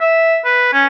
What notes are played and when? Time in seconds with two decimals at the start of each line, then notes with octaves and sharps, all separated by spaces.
0.01 E5
0.45 B4
0.73 C#4